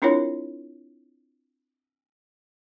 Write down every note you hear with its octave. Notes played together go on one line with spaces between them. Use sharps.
C4 D4 E4 F4 A#4 C#5